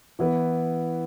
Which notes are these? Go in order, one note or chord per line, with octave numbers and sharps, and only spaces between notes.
E3 B3 E4 B4